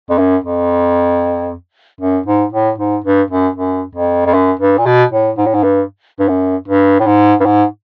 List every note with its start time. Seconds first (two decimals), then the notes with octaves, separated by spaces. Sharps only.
0.10 F2
0.19 F#2
0.44 F2
2.01 F#2
2.26 G#2
2.52 A2
2.78 G#2
3.04 G2
3.30 F#2
3.56 F#2
3.95 F2
4.26 F2
4.34 F#2
4.60 G2
4.78 A#2
4.86 B2
5.12 A2
5.38 G#2
5.46 A2
5.54 G#2
5.63 G2
6.20 G2
6.29 F#2
6.68 G2
7.00 A2
7.07 G#2
7.40 G2
7.46 G#2